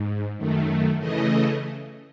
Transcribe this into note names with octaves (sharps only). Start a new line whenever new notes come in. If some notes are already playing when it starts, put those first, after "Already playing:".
Already playing: G#2
F#2 D#3 A3
C#3 E3 A3 D#5